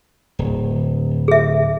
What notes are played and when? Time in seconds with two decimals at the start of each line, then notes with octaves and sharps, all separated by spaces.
0.39 D1
1.28 G#4 E5